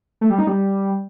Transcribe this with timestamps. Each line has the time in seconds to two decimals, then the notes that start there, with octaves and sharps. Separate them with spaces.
0.21 A3
0.30 G3
0.38 D#4
0.47 G3